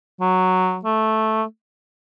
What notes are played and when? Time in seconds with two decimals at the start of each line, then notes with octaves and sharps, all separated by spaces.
0.20 F#3
0.85 A3